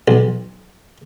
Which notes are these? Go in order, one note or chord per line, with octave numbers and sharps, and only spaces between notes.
B1